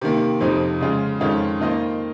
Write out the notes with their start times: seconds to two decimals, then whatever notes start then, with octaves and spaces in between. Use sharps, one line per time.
0.01 C3 D#3 A#3
0.40 F2 C3 F3 C4 D#4
0.80 C#3 G#3 C#4 F4 G#4
1.20 F2 D#3 G#3 C#4 F4
1.60 D#3 A#3 F4 C5 D#5